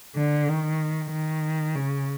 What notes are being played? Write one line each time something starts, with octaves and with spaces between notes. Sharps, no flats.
D3
D#3
D#3
C#3